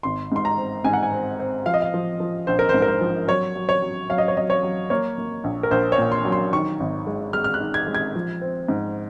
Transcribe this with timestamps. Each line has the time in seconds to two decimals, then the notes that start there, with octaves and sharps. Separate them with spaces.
0.03 G#1 C6
0.32 G#2 C6
0.45 A#5
0.58 C4
0.84 G#2 G#5
0.93 F#5
1.03 G#5
1.12 C4
1.39 C4
1.66 F3 F5
1.74 D#5
1.82 F5
1.94 F3
2.20 F3
2.47 A#1 C5
2.59 A#4
2.69 C5
2.74 G#2
2.82 A#4
2.88 C5
3.01 F3
3.28 F#3 C#5
3.56 F#3
3.69 C#5
3.82 F#3
4.10 F#3 F5
4.18 D#5
4.28 C#5
4.37 F#3 D#5
4.50 C#5
4.63 F#3
4.90 A#3 C#5
5.18 A#3
5.44 A#1
5.63 A#4
5.71 A#1 C5
5.92 C#5
5.98 A#2
6.12 C6
6.25 F#3
6.32 C6
6.53 D#3 C#6
6.80 G#1
7.07 G#3
7.33 G#3 F6
7.44 F6
7.54 F#6
7.60 D#3
7.74 G#6
7.88 G#3
7.95 G#6
8.15 F3
8.41 C4
8.68 G#2